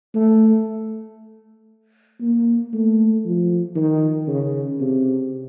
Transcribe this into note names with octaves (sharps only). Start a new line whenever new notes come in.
A3
A#3
A3
F3
D#3
C#3
C3